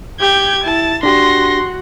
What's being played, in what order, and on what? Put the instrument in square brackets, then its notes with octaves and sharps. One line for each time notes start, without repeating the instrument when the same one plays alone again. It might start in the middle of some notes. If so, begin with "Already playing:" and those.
[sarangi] G4 [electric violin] G6 G#6
[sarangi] E4 [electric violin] A5
[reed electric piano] D4 G4 [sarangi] F#4 [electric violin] C6 A#6